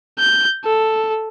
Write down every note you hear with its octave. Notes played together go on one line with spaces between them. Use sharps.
G6
A4